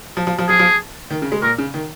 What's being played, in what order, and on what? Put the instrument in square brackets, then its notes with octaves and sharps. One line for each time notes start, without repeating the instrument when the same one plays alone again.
[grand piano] F3
F3
F3
[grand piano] F3 [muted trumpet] G#4
[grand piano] F3
D#3
C#3
G#3
[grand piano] A#2 [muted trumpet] A#4
[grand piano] C#3
D#3